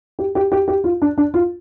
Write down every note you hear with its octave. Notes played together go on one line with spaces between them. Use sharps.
G4
G4
G4
G4
F4
D4
D4
F4